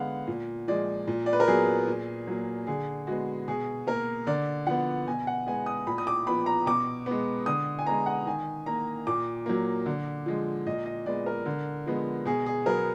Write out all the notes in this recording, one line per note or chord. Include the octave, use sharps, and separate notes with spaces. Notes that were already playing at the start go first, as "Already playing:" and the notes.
Already playing: D3 G#3 B3 F5 F#5
A#2
F3 G#3 D5
A#2
D5
B4
A#4
F#3 B3 G#4
A#2
F#3 A#3
D3 G#4
G#3 B3 F#4
B2 G#4
A#3 A#4
D3 D5
F3 B3 F#5
B2 G#5
F#5
G#3 B3 G#5
D#6
A#2 B5
D#6
D6
F3 B3 B5
A#5
B2 D6
G#3 B3
D3 D#6
G#5
G#3 B3 A#5
F#5
D#3 G#5
A#3 A#5
A#2 D6
F#3 A#3
D3
F3 G#3
A#2 D#5
D#5
G#3 B3 D5
A#4
D3
F3 G#3 B3
B2 G#4
G#4
F#3 B3 A#4